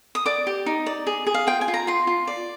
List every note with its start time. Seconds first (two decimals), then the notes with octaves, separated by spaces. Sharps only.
0.15 D#6
0.26 D5 D6
0.47 G4
0.66 D#4
0.86 D5
1.07 G#4
1.27 G#4
1.34 F5
1.47 F4 G5
1.61 G#5
1.68 F4
1.74 A#5
1.87 F4 C6
2.07 F4
2.27 D5